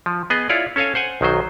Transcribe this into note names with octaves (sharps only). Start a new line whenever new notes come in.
F3
B3 G#4 D#5
E4 F4 C#5 D5
C#4 A4 C#5 F5 G#5
C5 F#5 G#5
B1 D#3 F#3 C5